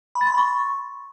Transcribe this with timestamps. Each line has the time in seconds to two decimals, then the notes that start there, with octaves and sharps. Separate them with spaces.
0.15 B5
0.21 A6
0.27 C6
0.32 B5
0.38 C#6